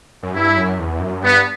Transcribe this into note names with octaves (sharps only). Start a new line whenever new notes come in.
F#2
G2 E4
F#2
E2
F#2
G2 B3